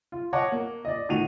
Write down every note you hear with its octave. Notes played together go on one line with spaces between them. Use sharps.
F4
C#5 D#5 F#5 A5 D6
A#3
D5 D#5
A2 D#3 F#4 D#7 F7